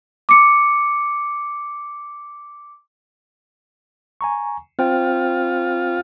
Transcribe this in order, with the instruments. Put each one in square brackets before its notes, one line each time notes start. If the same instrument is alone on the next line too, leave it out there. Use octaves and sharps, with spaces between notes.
[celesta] D6 C#7
[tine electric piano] G#5 A#5 C#6
[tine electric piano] C4 C5 G5 [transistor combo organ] F4